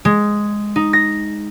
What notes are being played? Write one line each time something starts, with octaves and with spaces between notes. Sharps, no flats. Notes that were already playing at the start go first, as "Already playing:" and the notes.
G#3
D#4
A#6